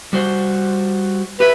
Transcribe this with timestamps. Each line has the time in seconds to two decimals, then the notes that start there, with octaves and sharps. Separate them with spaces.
0.13 G3 F#4 C5
1.40 G4 B4 E5